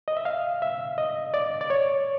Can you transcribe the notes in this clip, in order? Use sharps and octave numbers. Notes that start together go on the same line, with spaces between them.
D#5
E5
F5
E5
D#5
D5
D5
C#5